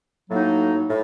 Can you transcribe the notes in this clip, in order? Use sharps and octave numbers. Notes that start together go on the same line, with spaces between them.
A2 F#3 A#3 D#4 F#4
A2